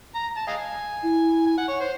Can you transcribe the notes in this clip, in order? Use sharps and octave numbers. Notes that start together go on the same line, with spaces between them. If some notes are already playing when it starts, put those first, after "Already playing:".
A#5
A5
D#5 F5 G#5
E4
G#5
F#5
C#5
C5